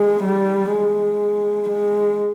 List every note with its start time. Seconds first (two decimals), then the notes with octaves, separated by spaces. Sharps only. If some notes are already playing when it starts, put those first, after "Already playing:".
Already playing: G#3
0.23 G3
0.71 G#3
1.69 G#3